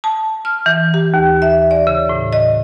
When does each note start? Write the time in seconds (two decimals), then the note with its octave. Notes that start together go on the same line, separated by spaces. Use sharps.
0.04 A5
0.45 F6
0.66 E3
0.94 G4
1.14 D#2
1.42 E5
1.71 D5
1.87 C#3
2.09 A2
2.33 D#5